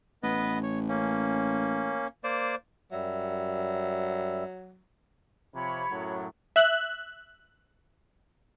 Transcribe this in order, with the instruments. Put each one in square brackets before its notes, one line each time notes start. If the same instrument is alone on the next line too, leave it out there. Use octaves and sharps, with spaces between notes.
[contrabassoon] A1 [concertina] B3 B4 D#5
[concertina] C#5
A#3 C#4
A#3 C5 D5
[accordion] F#2 G3 E5 [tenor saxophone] F#3
[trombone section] C3 F3 [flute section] C#5 B5
[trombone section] F#2 A2 F#3
[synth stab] E5 F#6